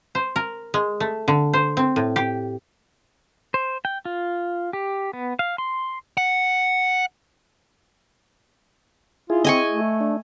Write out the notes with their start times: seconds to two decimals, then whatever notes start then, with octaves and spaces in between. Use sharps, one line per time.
0.15 C5
0.36 A#4
0.74 G#3
1.00 A3
1.28 D3
1.53 C5
1.77 C4
1.96 A2
2.16 G4
3.54 C5
3.85 G5
4.05 F4
4.73 G4
5.13 B3
5.39 F5
5.58 C6
6.17 F#5
9.30 E4 F4 G#4
9.44 C4 D#5 G#5 C#6
9.69 A3
10.00 D4